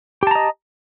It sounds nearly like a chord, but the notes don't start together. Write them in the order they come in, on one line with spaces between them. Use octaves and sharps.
G4 A5 A#5 D#5